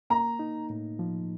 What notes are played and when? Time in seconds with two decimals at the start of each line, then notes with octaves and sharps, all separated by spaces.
0.10 A#3 A#5
0.39 D#4
0.70 A2
0.99 F3